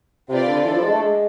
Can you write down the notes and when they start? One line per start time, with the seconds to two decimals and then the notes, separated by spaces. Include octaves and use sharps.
0.29 C3 C4 F4 B4 D5
0.47 D3
0.64 E3 D4 A4 D5
0.74 F3
0.82 G#3
0.92 A3
1.01 G#3